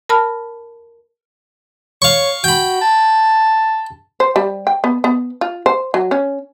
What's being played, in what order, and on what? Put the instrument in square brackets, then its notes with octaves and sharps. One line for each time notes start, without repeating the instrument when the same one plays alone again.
[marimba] A#4 A5 B5 F6
[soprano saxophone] C#5 [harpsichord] F5 C#6
[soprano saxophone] F#4 [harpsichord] G5 B5
[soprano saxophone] A5
[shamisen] C5
G3
G5
B3
B3
F4
C5
F#3
C#4